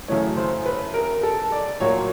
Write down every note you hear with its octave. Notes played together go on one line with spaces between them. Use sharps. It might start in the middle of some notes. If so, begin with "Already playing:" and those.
F#2 C#3 E3 A3 C#5
C5
B4
A#4
A4
D5
A#2 F#3 A#3 C#5